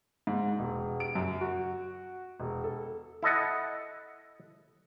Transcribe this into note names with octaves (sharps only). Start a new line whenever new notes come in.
G#2
E1
D7
F#2
F#4
E1
A4
E4 A4 D#5 F#5